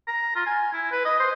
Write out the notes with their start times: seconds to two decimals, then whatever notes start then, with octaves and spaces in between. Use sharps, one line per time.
0.08 A#5
0.35 F4
0.46 G#5
0.73 E4
0.91 B4
1.05 D#5
1.20 C5